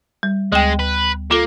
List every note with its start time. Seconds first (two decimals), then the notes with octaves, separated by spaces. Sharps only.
0.23 G3
0.52 D2 G#3 G5
0.79 B4
1.31 A#3 F4 A4